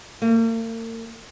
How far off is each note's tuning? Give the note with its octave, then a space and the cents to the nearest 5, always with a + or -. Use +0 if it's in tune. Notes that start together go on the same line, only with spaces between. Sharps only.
A#3 -45